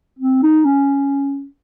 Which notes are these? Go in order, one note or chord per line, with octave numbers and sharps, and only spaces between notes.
C4
D#4
C#4